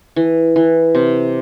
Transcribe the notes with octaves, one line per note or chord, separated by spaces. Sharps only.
E3
E3
C3